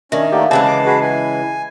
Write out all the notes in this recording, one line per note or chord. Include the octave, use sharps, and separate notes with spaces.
D#3 C#4 D4 A#4 E5
A3 A#3 G4 D5 D#5 F5 F#5
C#3 E3 G#3 C4 G#4 A5
D6 C7
F#4 G#4 B4
E4 G#5